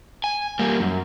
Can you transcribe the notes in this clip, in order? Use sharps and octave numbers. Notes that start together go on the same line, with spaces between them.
G#5
G3 A#3
F#2